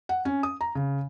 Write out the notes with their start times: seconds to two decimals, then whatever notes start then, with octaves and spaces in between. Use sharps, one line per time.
0.09 F#5
0.25 C#4
0.43 D#6
0.61 A#5
0.75 C#3